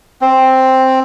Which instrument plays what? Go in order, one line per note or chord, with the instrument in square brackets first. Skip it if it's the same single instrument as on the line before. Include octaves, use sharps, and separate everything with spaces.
[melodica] C4